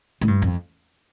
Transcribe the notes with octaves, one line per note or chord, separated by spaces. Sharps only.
A2
G2
F2